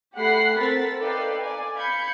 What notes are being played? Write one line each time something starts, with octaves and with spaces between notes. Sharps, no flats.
A3 G4 F#5 B5 F#6 C7
C4 A4 A#4 A6 B6
D#4 A4 B4 D5 F5 G5
D5 G#5
F5 B5 G6 G#6 C#7